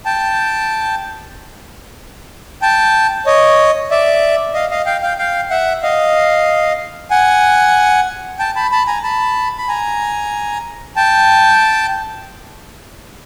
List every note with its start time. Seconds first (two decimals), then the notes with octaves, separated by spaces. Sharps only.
0.05 G5 A5
2.62 G5 A5
3.26 C#5 D#5
3.91 D5 E5
4.54 D#5 F5
4.71 D#5 F5
4.86 F5 G5
5.02 F5 G5
5.18 F5 G5
5.50 E5 F#5
5.82 D#5 F5
7.11 F#5 G#5
8.39 G5 A5
8.55 A5 B5
8.72 A5 B5
8.87 G#5 A#5
9.03 A5 B5
9.58 B5
9.68 G#5 A#5
10.96 G5 A5